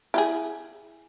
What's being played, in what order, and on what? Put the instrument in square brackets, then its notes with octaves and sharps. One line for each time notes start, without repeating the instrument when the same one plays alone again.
[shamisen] E4 G4 G#4